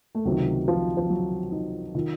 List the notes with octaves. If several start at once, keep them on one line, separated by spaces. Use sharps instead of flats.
A3
C#2 C3 D#3 F#3
F3
F3
F#3
D#4
D#3 F4